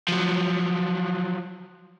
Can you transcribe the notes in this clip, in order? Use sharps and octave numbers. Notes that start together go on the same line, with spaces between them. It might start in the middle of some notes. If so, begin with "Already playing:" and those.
F3 F#3